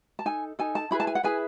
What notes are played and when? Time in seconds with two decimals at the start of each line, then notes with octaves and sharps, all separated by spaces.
0.19 A5
0.25 D#4 A4 G#5
0.59 D#4 A4 G#5
0.75 A5
0.91 E4 G#4 B4 B5
1.00 A5
1.07 G#5
1.15 F#5
1.23 E4 G#4 B4 G#5